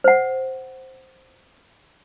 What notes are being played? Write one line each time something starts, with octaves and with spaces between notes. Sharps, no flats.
C5 F#5